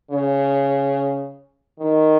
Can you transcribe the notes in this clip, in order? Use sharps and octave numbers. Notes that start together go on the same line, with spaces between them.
C#3
D#3